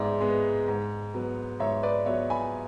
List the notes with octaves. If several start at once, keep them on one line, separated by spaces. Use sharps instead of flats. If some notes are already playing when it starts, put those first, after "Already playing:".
Already playing: G#2 G#3 B3 D5 E5
G#3 B3
G#2
F#3 B3
G#2 C#5 E5
B4 D5
F#3 B3 C#5 E5
G#5 B5